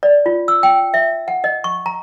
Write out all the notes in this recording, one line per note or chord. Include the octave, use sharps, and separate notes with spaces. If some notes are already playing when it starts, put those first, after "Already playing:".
D5
F4
E6
G5
E5
F#5
D#5
C#6
A#5